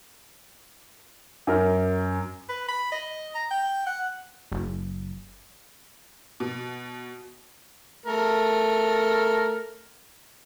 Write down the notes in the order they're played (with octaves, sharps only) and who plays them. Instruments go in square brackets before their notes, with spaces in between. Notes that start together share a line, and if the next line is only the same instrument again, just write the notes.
[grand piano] F#2 A#4
[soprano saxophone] B4
B5
D#5
A#5
G5
F#5
[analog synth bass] F#1
[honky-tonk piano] B2
[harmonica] A3 A#4